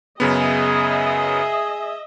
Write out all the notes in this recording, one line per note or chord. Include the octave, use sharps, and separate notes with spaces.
F#2 C#3 B3 G#4 D#5 E5